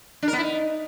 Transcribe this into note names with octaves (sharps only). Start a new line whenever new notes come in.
D4
A#4
B3
E4
D#4